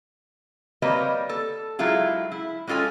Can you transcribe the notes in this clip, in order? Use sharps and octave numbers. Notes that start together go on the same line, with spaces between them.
G3 A#3 C4 B4 C#5 D#5
A4
F#3 G#3 E4 F4 G#4
E4
G#3 C#4 F4 A4 G#5